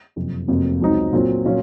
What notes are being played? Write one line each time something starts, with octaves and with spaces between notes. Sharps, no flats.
F#1 F2 C3
F1 F2 C3 F#3 A#3
C#2 C3 F#3 C4 D#4
A#2 F#3 C4
A#2 F#3 C#4 F4